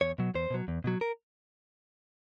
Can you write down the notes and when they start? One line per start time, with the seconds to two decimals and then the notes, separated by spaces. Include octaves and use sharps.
0.01 E2 C#5
0.18 B2 F#3
0.35 E2 C5
0.50 B2 F#3
0.68 E2
0.84 B2 F#3
1.01 A#4